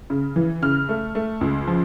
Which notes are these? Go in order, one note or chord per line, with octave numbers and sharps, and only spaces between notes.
C#3
E3
C#3 F6
A3
A3
C#2
F3